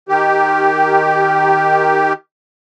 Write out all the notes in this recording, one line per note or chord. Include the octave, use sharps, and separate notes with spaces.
D#3 G4